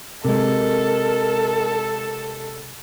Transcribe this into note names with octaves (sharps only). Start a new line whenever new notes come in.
C3 G#3 A4 A#4